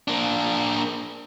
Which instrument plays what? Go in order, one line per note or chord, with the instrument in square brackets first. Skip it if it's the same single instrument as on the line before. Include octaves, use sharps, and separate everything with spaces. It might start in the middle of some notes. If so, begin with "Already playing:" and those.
[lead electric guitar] A#3 D4